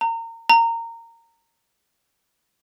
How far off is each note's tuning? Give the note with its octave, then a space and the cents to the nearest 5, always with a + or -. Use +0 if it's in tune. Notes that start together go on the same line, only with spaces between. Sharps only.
A#5 -30
A#5 -20